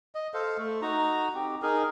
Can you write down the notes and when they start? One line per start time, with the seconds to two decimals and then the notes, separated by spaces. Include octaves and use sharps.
0.15 D#5
0.34 A4 C5 F5
0.58 A3
0.82 D#4 F#4 A#5
1.35 C4 G4
1.62 D#4 G#4 A#4